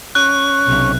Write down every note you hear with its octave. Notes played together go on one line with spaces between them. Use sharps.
C#4 F#6
B1 C3